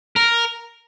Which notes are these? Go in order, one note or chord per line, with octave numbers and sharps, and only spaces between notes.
A#4